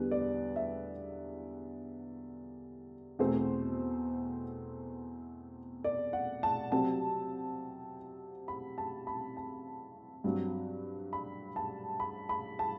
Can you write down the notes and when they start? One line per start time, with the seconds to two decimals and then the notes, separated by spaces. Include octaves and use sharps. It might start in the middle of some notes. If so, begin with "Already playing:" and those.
Already playing: E2 D3 G3 B3 B4
0.11 D5
0.56 E5
3.19 E2 B2 A3 C4 C5
5.84 D5
6.13 F#5
6.43 A5
6.72 C3 F#3 C4 A5
8.48 B5
8.78 A5
9.07 B5
9.37 A5
10.24 G2 F#3 C4
11.13 B5
11.56 A5
12.00 B5
12.29 B5
12.59 A5